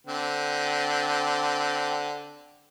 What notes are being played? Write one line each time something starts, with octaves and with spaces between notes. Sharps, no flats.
D3 C4